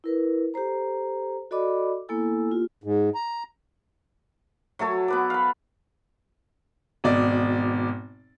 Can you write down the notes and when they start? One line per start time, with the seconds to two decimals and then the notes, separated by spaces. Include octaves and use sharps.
0.04 E4 A#4 B4
0.54 G4 A4 C5 A#5
1.51 F#4 A4 D5 D#5 B5 D6
2.09 A#3 B3 E4 A4 G#5 E6
2.51 A#3 F4 G4
2.84 G#2
3.15 A#5
4.79 F#3 A3 A4 C#5
5.08 B3 B4 D6
5.30 F5 B5
7.04 G#1 B2 D5